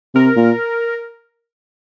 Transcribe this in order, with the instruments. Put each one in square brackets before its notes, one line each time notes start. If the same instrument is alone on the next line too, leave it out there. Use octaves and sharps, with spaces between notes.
[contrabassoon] C3 [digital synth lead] A#4
[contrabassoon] A#2